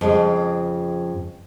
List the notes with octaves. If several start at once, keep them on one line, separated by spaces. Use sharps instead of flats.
F2 C#3 G#3